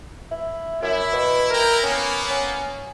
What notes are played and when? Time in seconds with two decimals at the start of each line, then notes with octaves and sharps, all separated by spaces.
0.31 E4
0.82 F#2 E4
1.13 B2
1.50 E4 A#4 G5 A#5
1.83 A#3 B3 C#4
2.30 C#4